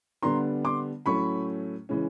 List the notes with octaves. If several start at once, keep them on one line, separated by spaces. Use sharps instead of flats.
D3 G3 B3 D4 A#5 C6
C6 D6
A2 F#3 A3 C#4 B5 C#6
C#3 E3 G#3 C#4